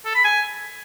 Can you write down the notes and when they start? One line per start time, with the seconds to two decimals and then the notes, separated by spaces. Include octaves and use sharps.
0.05 A4
0.15 B5
0.24 G#5